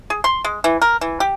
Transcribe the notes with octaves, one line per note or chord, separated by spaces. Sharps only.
G#4
C6
G#3
E3
A#4
E3
G4